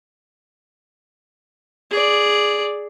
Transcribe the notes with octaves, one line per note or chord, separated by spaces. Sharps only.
G#4 D5